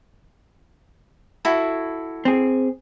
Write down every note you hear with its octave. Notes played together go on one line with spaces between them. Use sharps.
E4 F#4 A4
C4 G#4